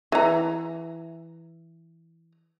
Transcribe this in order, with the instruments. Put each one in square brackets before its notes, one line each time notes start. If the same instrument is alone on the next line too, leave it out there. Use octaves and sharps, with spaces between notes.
[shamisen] E3 A#5